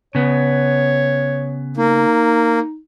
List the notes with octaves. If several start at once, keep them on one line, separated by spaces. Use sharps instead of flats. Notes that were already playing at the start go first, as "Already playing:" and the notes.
C#3 B3 C#5
A#3 D#4